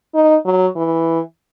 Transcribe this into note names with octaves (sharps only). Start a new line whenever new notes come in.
D#4
F#3
E3